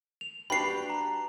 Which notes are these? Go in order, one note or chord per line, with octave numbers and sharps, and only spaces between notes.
F7
D4 F#4 G4 B4 G5 B5 C7
A#5